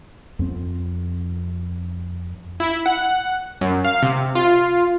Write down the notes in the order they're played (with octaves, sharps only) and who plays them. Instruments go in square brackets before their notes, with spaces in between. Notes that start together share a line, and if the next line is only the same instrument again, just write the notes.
[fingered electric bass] F2 C4
[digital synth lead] E4
F#5
F#2
F5
C3
F4